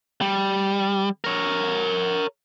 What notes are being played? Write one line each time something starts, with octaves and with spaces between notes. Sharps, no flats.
G3
A#4 C#5